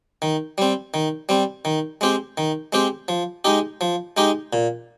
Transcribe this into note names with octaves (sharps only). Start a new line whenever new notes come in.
D#3
G3 C4
D#3
G3 C4
D#3
G#3 C4 G4
D#3
G#3 C4 G4
F3
G#3 D#4 G4
F3
G#3 D#4 G4
A#2